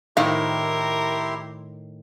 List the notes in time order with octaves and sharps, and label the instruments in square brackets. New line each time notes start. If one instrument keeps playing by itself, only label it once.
[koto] A2 D#3 [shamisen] F3 F5 [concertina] E4 G4 C6 [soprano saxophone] A#4